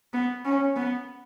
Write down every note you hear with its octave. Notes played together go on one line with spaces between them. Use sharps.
B3
C#4
B3